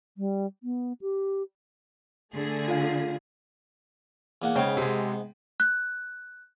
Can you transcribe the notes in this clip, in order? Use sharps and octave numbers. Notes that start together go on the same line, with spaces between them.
G3
B3
G4
D3 A3 G#4
F4 F5
E2 A#3 F#5
G#2 C#3 B3 C#5 G5
C3 G#3
F#6